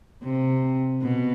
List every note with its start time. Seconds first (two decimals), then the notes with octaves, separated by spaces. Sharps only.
0.23 C3
1.02 B2